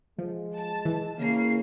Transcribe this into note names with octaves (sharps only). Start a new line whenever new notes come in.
F3 G#3
A5
E3
C#3 A#3 C7